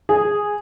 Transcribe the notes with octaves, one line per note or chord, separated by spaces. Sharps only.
G#4